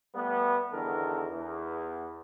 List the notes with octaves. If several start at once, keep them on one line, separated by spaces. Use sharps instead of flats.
G3 A3 B3
E2 D3 D#3 A4 A#4
E2